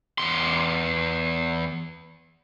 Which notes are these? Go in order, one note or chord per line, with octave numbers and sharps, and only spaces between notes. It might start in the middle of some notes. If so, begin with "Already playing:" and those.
E2 C6